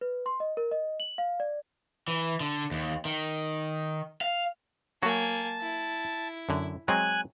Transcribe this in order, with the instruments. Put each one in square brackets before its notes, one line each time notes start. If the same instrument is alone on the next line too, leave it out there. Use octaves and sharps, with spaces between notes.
[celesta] B4
C6
D#5
A#4
D#5
F#7
F5
D5
[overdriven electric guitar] E3
D3
D#2
D#3
F5
[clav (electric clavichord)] F#3 F#4 [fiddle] A#3 G#5 [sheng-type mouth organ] A5
[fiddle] E4
[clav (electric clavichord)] F#2 D3
[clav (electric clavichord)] F#3 G#3 C4 [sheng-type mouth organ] G#5 F#6